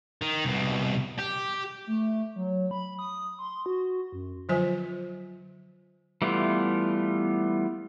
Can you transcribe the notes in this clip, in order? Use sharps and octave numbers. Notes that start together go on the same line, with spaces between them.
D#3
C2 B2
G4
A3
F#3
B5
D#6
C6
F#4
F#2
D3 F3 F#3 F4 C5 G#5
E3 G3 A3 B3 F4